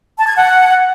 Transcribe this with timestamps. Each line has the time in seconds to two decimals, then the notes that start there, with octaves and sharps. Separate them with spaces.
0.18 A5
0.27 G#6
0.36 F#5